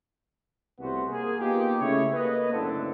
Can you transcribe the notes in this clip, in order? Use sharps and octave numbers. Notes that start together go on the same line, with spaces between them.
C2 A2 E3 B3 F#4 C5
A#3 G#4
A#3 B3 D#4 F4 G4
C#3 A3 E4 G#4 C#5
A#3 B4 D#5
F#1 A2 D3 C4 A4